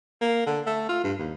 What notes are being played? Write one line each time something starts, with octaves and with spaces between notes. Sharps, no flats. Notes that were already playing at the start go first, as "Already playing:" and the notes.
A#3
D3
A3
F4
G2
D#2